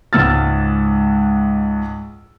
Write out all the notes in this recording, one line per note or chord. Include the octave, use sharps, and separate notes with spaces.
C#2 G#2 E6 F6 A6